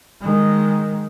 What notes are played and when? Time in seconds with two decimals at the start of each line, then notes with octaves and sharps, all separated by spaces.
0.21 D#3 G#3